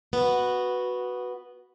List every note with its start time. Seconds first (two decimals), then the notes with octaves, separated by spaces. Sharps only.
0.13 B3 F#4